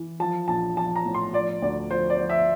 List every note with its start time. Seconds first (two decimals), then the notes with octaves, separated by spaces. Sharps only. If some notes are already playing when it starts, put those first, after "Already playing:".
Already playing: E3
0.20 F3 A5
0.48 A#1 A5
0.77 F3 A5
0.96 A#5
1.06 A2
1.14 C6
1.33 F3 D5
1.62 D2 D5
1.90 F3 C5
2.10 D5
2.20 F3
2.30 E5